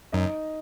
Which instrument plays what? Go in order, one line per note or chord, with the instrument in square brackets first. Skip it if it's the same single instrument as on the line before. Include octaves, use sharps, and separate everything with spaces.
[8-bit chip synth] F#2 [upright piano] D#4 D#5